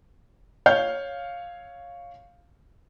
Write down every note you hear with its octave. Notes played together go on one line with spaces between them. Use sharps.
C#5 F5 G6